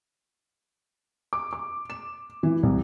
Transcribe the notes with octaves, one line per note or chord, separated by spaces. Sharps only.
D6
D6
E7
E3
C2